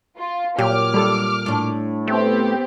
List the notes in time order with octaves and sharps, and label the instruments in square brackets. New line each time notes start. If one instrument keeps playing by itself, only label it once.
[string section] F4
[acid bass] A#2 [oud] F#3 [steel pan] G4 [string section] D6 F6
[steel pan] G3 A4
[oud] A2 D4
[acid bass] A3 [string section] B3 C4 G4